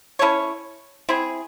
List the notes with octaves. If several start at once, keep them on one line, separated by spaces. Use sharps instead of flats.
C#4 E4 A4 C#5
C4 E4 G#4